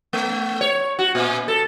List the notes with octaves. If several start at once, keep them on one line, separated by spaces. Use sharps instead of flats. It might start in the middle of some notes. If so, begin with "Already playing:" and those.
A3
C#5
F#4
A#2
A4